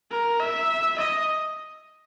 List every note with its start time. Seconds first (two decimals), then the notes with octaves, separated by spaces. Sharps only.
0.11 A#4
0.40 E5
0.98 D#5